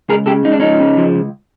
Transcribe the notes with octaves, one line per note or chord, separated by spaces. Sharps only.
C#2 G#4 A#4
C#3 G4 A4
C#2 D#4
D4
F3 C#4 D#4
C#3
F3
C#2